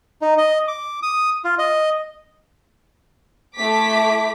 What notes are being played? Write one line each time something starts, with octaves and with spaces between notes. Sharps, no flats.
D#4
D#5
D6
D#6
F4
D#5
A3 E4 D6 B6